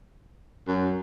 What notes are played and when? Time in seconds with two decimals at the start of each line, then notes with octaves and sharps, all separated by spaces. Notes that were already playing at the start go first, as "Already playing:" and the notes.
0.67 F#2